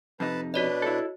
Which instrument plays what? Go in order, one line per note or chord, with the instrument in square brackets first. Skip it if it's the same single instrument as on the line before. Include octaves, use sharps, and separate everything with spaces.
[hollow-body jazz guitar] F2 C3 D#4 [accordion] B4 A5
[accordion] B2 D4 B4 [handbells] F#4 C#5 D#5
[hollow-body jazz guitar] E4 A4